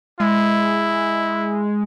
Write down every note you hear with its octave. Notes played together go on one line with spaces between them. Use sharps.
G#3 E4